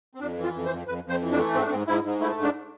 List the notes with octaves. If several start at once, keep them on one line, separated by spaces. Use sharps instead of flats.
C4
F2 D4
E3
F4
F2
C5
F2
F2 B4
F2
C5
E3
D4
A3
G#2 C4
D4
G#2 C4
G#2 E4
G#2
A3 E4
G#2
D4